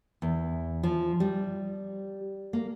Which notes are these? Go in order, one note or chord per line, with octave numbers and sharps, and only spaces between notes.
E2
F3
G3
A#3